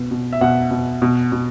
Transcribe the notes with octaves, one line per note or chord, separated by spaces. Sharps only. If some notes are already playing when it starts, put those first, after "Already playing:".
Already playing: B2 B3
B2
E5
B2 F#5
B2
B2
B2